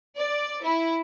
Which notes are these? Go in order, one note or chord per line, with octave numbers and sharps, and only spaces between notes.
D5
E4